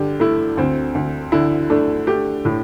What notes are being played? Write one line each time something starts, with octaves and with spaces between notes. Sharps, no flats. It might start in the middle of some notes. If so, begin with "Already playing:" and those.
Already playing: G2 D3 G4
A3 E4
D2 C4
D2
D3 E4
A3 D4
A3 G4
A2